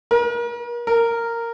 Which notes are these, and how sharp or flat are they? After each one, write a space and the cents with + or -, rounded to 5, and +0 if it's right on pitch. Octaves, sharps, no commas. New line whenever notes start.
A#4 +40
A#4 -10